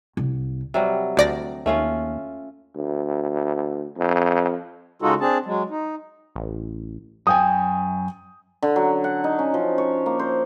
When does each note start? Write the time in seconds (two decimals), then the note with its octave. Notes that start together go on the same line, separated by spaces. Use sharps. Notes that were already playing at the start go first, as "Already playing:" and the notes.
0.17 C2
0.74 C3 F#3 G3
1.17 D2 D5 A#6
1.66 D#2 A3 C#4 F4
2.75 D2
3.97 F2
5.02 C#3 G#3 D#4 F4 F#4 A4
5.20 C4 D4 G#4 A5
5.46 F#3 G#3
5.70 D#4
6.36 A1
7.27 F#2 G5 G#5 D#6
8.62 D3
8.76 F#3
9.04 F#5
9.24 D#4
9.39 C#4
9.54 F3
9.78 C#5
10.06 A#3
10.19 C5